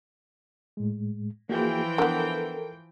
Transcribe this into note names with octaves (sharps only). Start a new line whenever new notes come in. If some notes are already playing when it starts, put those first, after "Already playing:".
A2 G#3
E3 F3 A#3 F#4 G#4 G5
D3 B3 A4 A#4